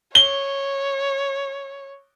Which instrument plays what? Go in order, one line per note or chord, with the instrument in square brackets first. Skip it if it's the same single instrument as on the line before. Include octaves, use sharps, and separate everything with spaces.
[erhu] C#5 [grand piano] G7